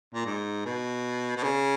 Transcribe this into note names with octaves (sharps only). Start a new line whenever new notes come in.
A#2
G#2
B2
B2
C#3